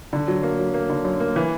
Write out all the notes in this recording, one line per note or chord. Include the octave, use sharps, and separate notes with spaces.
D3
F#3
A#3
F#3
A#3
D3
F#2
A#3
E3